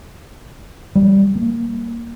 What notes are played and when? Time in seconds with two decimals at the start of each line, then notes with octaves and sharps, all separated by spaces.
0.95 G3
1.35 A#3